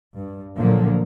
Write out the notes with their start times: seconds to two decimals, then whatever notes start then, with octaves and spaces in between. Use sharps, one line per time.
0.14 G2
0.58 A#2 D3 F3 F#3 A#3